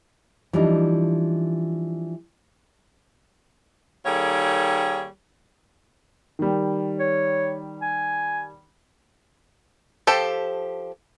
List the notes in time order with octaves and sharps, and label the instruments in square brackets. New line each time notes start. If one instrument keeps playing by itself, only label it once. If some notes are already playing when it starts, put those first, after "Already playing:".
[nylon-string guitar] E3 F3 G3 D4 D#4
[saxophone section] D#3 G3 A#3 G#4 A4 C#5
[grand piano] D#3 G3
[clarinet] C#5
G#5
[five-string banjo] F3 G4 A4 A5